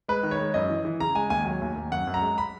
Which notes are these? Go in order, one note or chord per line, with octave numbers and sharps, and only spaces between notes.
G#3 B4
D#3
C#5
G#3
F#2 D#5
E3
E3
C#3 A#5
G#3 G#5
D#2 G#5
F#3 G#5
D#2
D#2
F#2 F#5
F#2
A#5
G#3
B5